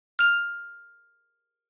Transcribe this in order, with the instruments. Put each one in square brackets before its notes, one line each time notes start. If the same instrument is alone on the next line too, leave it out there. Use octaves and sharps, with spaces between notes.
[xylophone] F6 F7